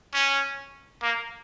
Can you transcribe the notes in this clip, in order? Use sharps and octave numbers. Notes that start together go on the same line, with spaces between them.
C#4
A#3